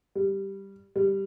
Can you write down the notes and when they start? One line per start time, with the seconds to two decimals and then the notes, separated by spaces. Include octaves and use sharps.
0.15 G3
0.96 G3